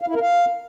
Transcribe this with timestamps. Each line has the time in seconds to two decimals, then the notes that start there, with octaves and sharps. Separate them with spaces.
0.02 F5
0.08 E4
0.15 A#4
0.22 F5